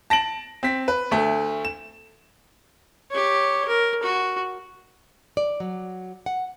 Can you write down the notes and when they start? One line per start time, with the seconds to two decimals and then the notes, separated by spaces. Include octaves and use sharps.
0.10 A5 A#6 D7 F#7
0.63 C4 B6
0.88 B4
1.11 D2 A3
1.65 E7
3.11 G4 C#5
3.68 A#4
4.03 F#4
5.37 D5
5.60 F#3
6.26 F#5